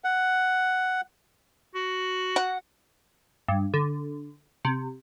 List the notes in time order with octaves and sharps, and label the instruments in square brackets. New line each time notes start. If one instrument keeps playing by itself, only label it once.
[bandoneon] F#5
[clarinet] F#4
[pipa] F#5
[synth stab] G2
D3
C3